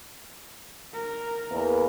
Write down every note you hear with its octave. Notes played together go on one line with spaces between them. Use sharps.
A#4
E2 A#3 B4